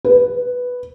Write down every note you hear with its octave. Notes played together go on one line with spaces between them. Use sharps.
B4